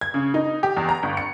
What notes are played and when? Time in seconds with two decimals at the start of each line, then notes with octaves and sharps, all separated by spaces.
0.01 G#6
0.14 C#3
0.34 D#4
0.63 G4
0.77 E2
0.89 A#5
1.03 G1
1.17 C#7